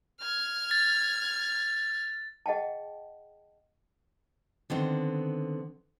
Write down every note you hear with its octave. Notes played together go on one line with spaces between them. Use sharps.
F6 G#6
A6
G#4 D#5 F#5 G5 A5
D3 D#3 B3 C4